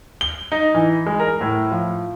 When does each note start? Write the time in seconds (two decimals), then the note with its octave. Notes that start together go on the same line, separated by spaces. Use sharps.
0.21 G7
0.52 D#4
0.75 E3
1.06 G#3
1.20 A#4
1.41 A2
1.71 F3